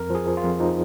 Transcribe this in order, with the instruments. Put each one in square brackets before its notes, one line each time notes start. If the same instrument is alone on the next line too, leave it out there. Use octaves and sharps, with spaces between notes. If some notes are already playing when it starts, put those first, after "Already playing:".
Already playing: [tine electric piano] F2 A#4
F3 G#4
F3
F4
F2
F3 D#4